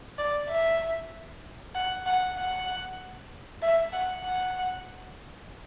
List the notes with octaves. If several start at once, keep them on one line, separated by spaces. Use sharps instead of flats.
D5
E5
F#5
F#5
F#5
E5
F#5
F#5